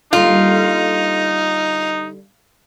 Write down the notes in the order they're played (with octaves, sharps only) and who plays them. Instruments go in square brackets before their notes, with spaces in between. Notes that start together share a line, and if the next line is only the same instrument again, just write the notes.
[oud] D3 G3 A#3 [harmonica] D#4 [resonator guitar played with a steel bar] F4